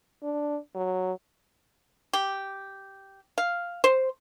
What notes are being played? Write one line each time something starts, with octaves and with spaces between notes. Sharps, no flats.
D4
F#3
G4
F5
C5